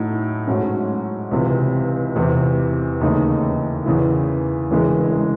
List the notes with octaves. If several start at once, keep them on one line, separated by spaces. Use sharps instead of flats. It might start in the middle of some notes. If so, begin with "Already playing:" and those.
Already playing: A2 F#3 A3 D#4
G#2 F#3 A3 C#4
C#2 C3 E3
E2 C3 E3 C4
D#2 C#3 E3 A3 D#4
E2 C#3 E3
E1 E2 C#3 E3 G#3